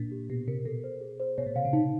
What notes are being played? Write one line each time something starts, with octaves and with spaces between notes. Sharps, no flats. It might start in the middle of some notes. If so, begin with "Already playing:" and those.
Already playing: A#2 D4
G4
B2 G4
C3 A#4
B2 A4
C5
G#4
C5
B2 C#5
A#2
C3 F5
C#3
C3 D#4